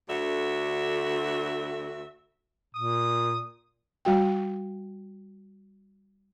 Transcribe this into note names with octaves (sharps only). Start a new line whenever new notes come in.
D2 D3 F#4 E5
A#2 D#6
G3 F#4 G5